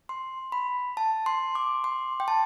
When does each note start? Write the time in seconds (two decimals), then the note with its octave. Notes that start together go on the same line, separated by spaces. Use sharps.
0.09 C6
0.52 B5
0.97 A5
1.26 C6
1.55 D6
1.84 C6
2.20 G5
2.28 A5